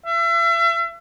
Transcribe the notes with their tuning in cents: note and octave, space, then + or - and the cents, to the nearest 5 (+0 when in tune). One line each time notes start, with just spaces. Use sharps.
E5 +35